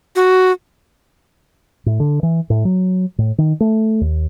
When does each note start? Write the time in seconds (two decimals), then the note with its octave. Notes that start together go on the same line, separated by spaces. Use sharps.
0.16 F#4
1.86 A2
2.00 D3
2.23 E3
2.50 A2
2.65 F#3
3.18 A2
3.38 D#3
3.60 A3
4.01 D#2